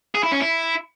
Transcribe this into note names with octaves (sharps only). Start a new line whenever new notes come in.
G#4
E4
C#4
E4